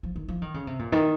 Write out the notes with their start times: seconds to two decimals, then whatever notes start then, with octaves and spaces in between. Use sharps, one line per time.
0.03 F3
0.16 D#3
0.28 F3
0.42 D#3
0.54 C#3
0.67 C3
0.79 A#2
0.92 D#3